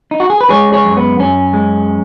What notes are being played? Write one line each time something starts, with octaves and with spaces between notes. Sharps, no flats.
D#4
F#4
G#4
B4
G#3 G#4 C#5
G#4 C#5
F#2
B3
F#2 C#4
G#3